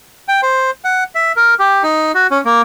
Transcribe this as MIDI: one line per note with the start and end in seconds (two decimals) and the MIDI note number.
0.28 0.41 79
0.43 0.71 72
0.84 1.04 78
1.15 1.32 76
1.36 1.54 70
1.59 1.83 67
1.83 2.12 63
2.14 2.27 66
2.31 2.41 61
2.45 2.62 58